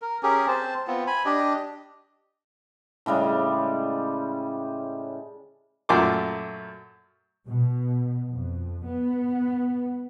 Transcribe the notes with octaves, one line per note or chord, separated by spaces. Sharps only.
A#4
C#4 G4 G#4 A#4
C4 C5 A5
B3 C4 F4
G#5 B5
D4 G4 D#5
A2 C#3 G3 G#3
F#2 A#2 A3 A#4 C6 D6
B2
F2
B3